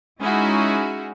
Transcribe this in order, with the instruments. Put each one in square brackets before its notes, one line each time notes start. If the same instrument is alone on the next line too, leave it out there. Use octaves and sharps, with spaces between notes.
[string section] G#3 C#4 D#4 E4 F#4 G#4